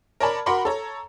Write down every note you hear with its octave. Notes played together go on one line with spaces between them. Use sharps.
A#4 C#5 D5 A5 B5
F#4 A#4 F#5 B5 C6 D6
A4 C#5 A#5